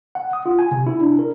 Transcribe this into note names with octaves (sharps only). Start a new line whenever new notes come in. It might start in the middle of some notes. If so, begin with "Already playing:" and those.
F#5
D#6
F4
G#5
C3
E4
D4
A#4